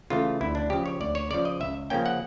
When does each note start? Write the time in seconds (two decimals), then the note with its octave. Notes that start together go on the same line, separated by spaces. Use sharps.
0.10 C#3 E3 A3 F4
0.41 D2 E4
0.55 D4
0.70 C#3 F3 G4
0.86 C#5
1.00 D2 D5
1.15 C#5
1.31 C#3 F3 D5
1.45 D#5
1.60 C#2 E5
1.90 C#3 F3 A#3 C#4 G5
2.06 F#5